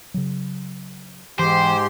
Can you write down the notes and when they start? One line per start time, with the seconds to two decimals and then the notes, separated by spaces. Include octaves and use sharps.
0.14 C#3 F#3
1.39 G#2 E3 G4 C5 C6